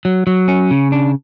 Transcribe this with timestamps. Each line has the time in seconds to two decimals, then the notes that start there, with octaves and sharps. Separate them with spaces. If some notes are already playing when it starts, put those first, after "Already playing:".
0.05 F#3
0.27 F#3
0.48 C#4
0.71 C#3
0.92 D4